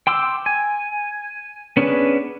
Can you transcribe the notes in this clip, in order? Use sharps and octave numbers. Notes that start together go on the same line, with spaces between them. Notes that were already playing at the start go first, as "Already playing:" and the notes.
G5 C6 D6 E6
G#5
B3 C#4 D4 G#4 B4